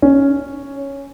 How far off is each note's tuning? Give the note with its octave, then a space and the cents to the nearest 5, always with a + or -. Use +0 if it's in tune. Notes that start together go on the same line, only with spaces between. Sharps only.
C#4 +0